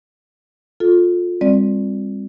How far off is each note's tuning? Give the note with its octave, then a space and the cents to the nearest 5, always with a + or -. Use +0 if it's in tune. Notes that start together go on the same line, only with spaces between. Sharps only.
F4 +20 A4 +0
G3 +40 C4 +15 D5 +0